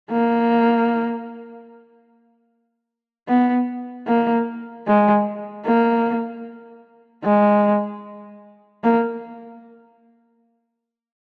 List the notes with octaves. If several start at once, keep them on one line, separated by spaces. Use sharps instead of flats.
A#3
B3
A#3
G#3
A#3
G#3
A#3